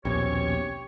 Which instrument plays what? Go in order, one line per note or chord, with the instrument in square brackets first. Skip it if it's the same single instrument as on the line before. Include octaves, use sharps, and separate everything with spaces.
[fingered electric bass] A#1 B2 [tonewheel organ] D#2 C#4 C#6 [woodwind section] G4 C#5